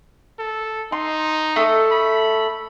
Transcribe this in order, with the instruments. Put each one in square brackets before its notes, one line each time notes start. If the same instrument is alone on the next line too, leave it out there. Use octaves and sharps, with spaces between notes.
[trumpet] A4
[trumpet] D#4 [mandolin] C6
[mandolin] A3 A4 D#6
[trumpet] B5